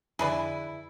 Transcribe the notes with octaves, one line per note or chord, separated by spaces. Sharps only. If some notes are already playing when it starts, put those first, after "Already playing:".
F2 D3 E4 G#4 B4 D5